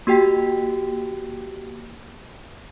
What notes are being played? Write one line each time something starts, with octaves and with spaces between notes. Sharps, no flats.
A#3 F#4 G4 G5 B6